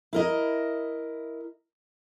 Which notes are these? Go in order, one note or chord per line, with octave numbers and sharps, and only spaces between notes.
E4 A#4 D#5